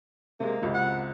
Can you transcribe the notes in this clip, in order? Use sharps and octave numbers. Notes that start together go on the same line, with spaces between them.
C3 G#3 A#3
G#1 C#2 C3
F#5